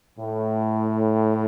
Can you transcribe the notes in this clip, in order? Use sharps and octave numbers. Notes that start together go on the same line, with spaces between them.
A2